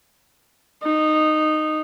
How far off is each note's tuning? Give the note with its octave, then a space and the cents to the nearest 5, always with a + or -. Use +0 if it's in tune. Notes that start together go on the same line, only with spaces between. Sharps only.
D#4 -10